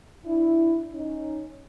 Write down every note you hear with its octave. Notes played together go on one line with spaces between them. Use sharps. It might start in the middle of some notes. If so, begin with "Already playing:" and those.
D4 E4
C#4 D#4